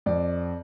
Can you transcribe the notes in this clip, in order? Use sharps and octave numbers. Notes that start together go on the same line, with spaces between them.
F2 D5